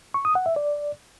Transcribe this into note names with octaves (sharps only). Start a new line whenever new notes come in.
C#6
D#6
F#5
E5
D5